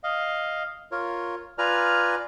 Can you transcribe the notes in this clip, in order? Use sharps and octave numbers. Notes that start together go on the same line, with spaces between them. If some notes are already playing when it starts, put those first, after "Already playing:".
D#5 F5
F4 A#4 C#5
F4 B4 D5 G#5 A#5 F6